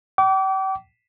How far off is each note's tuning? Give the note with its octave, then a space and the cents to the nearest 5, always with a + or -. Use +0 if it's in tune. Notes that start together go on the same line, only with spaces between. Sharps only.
G5 -40 D6 -30